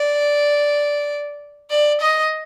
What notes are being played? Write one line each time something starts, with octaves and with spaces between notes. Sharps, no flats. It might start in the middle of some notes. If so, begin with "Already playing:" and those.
Already playing: D5
D5
D#5